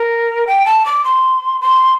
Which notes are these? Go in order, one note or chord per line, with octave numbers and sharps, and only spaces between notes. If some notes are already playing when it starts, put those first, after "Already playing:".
Already playing: A#4
G5
A5
D6
C6
C6